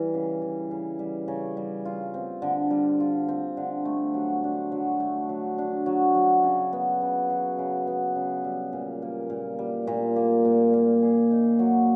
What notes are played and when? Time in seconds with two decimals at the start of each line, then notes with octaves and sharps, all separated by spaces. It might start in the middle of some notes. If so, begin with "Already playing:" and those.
Already playing: E3 G3
0.14 C#3
0.42 E3
0.71 C#3
0.99 G3
1.28 C#3
1.57 G3
1.85 F4
2.14 C4
2.42 D3
2.71 G3
3.00 F4
3.28 C4
3.57 D3
3.85 A3
4.14 F#3
4.44 D4
4.72 F#3
5.00 A3
5.29 F#3
5.58 D4
5.86 F#3
6.15 F#3
6.44 C#3
6.73 B3
7.01 C#3
7.30 F#3
7.58 C#3
7.87 B3
8.15 C#3
8.44 G3
8.73 A#2
9.02 A#3
9.30 A#2
9.59 G3
9.87 A#2
10.16 A#3
10.45 A#2
10.73 A#3
11.02 G#4
11.31 D#4
11.59 F#3